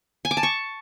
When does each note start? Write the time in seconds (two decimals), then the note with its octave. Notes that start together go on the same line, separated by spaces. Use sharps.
0.25 G#5
0.31 D6
0.37 A5
0.43 C#6